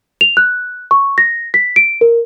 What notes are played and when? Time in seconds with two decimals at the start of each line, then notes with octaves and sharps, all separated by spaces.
0.21 F7
0.37 F#6
0.91 C#6
1.18 A#6
1.54 B6
1.76 D7
2.01 A#4